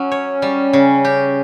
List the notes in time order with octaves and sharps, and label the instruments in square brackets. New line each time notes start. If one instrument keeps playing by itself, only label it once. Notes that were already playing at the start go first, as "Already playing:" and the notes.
Already playing: [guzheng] F#3 [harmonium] C#4
[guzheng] C#5
G3
C#3
G4